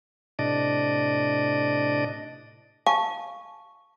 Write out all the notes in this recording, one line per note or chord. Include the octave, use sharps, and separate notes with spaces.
A2 C3 D4 D5 D#5
F5 G#5 A5 C#6